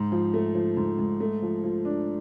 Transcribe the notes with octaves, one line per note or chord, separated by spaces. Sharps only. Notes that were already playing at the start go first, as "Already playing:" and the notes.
Already playing: G#2
F3
A3
F3
G#2
G#2
A3
F3
F3
D4